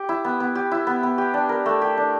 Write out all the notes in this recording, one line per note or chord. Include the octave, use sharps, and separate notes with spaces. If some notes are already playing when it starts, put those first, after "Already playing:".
Already playing: G4
E4
B3
B3
G4
E4
B3
B3
G4
D4
A#4
A3
G4
D4